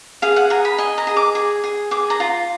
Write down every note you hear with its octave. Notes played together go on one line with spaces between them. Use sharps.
G#4 F5
F#5
G#4 A#5
B5
D#5 G#5
A#5
G#4
D6
G#4
G#4
G#4 D6
A#5
F4